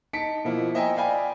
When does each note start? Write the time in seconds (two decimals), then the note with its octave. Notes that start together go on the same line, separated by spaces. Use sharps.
0.13 D#4 A5 B6 C#7 D7
0.44 B2 F3 A#3 E4
0.74 C5 D#5 E5 G5 G#5 A#5
0.96 D5 F5 G5 G#5 B5